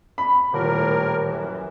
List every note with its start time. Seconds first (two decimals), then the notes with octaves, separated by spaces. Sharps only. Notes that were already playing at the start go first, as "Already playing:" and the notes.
0.18 B5
0.53 D#1 A2 A#4
1.24 F#2 E3